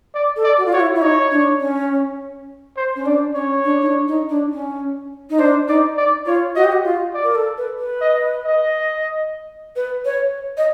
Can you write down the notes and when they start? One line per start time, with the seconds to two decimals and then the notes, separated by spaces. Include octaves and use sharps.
0.14 D5
0.36 A4
0.44 D5
0.58 F#4
0.66 F4
0.73 F#4 C#5
0.80 E4
0.95 E4
1.02 D#4 C#5
1.31 D4
1.60 C#4
2.77 C5
2.96 C#4
3.06 D4 D5
3.35 C#4 C#5
3.64 D4
3.81 D#4
3.86 D4
4.08 D#4
4.29 D4
4.52 C#4
5.30 D#4
5.39 D4 C5
5.68 D#4 D5
5.97 D5
6.26 F4 C#5
6.55 F#4 D#5
6.64 G4
6.72 F#4
6.84 F4
7.14 D5
7.24 A#4
7.35 A4
7.58 B4
7.79 B4
8.01 D#5
8.45 D#5
9.76 B4
10.05 C#5
10.57 D#5